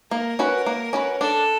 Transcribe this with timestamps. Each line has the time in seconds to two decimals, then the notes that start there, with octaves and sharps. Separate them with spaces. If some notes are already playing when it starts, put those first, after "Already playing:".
0.11 A#3 A#4
0.39 C#4 F#4 B4
0.66 A#3
0.93 C#4 F#4 B4
1.21 D4 A4